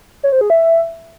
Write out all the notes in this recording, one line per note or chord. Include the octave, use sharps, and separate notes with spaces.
C#5
C5
G#4
E5